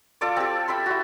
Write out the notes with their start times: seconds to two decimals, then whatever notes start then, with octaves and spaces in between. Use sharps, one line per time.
0.21 F4 A4 D5 D6
0.36 C4 G4
0.68 E5 G5 B5 C6
0.86 E4 F#4